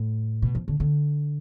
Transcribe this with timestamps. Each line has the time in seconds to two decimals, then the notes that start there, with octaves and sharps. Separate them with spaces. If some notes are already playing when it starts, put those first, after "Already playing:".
Already playing: A2
0.42 B2
0.55 F3
0.68 D3
0.80 D3